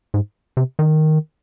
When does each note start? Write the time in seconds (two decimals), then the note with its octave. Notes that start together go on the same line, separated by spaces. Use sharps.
0.14 G#2
0.57 C3
0.79 D#3